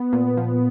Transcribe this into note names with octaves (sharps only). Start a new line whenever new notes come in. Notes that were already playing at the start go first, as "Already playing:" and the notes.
Already playing: B3
A#2
F3